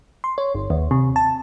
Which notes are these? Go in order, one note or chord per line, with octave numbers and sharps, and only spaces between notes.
C6
C#5
G1
D#2
C3
A5